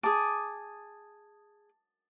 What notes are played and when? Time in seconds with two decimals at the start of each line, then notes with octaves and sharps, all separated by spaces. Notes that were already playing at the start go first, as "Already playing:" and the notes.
0.03 G#4 A5 D6 D#6